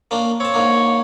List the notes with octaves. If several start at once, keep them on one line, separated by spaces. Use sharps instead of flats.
A#3 C#4 D4
C4 C#5 A5
G#2 A#3 D4